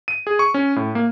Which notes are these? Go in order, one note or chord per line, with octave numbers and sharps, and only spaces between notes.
D#7
G#4
C#6
C#4
A2
A#3